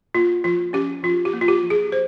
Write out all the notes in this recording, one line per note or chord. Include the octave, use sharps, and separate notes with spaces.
A#3 F4
F3 F4
C#4 G4
F3 F4
G4
A#3
F4
G4
F3
G#4
C5